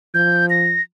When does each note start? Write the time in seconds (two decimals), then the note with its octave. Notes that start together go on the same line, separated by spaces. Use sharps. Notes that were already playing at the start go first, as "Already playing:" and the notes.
0.14 F3 G6
0.50 A#6